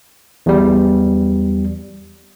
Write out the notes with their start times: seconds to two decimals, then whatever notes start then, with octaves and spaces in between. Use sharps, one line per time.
0.46 E2 G3